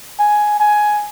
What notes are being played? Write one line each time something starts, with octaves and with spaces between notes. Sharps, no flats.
G#5
G#5